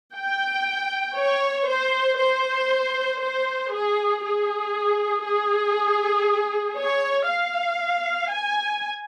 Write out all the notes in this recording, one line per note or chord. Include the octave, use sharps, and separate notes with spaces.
G5
C#5
C5
C5
C5
G#4
G#4
G#4
C#5
F5
G#5